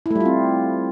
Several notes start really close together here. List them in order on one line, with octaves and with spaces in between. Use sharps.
E4 A3 G3 F4 C4